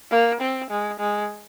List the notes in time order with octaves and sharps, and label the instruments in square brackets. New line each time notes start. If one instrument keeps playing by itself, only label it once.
[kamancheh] A#3
C4
G#3
G#3